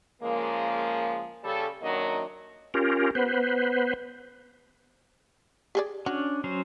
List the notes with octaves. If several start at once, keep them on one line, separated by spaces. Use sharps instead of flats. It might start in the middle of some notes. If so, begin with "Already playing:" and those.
C#3 F3 G#3 A#3
C#3 G3 A4
F#2 D#3 F#3 A#3 D4 D#5
C#4 F4 G4 A#4
B3 B4 C5
G4 G#4 D5
C#4 D4 F#4
F#3 C#4 C5